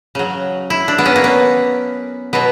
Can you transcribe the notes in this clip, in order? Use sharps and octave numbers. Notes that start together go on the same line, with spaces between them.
C#3 F#3
E4
D4
B3
C#4
A#3
B3
B2 F#3 B3